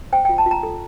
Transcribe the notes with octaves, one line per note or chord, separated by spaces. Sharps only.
C5 G5
G5
F4
A5
F4 A#5
A4